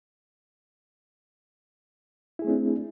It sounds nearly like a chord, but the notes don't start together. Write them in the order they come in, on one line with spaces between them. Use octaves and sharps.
E4 G#4 A3 C4 D4